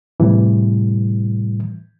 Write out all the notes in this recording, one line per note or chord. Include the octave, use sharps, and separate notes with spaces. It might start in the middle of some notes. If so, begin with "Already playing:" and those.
A2 C3 E3 G3